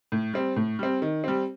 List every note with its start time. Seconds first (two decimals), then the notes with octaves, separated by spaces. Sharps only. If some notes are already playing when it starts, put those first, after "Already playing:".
0.12 A2
0.34 G3 C4
0.56 A2
0.79 G3 C4
1.02 D#3
1.24 G3 C4